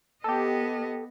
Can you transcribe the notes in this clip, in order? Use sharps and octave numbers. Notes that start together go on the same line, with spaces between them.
B3 G4 A4 D#5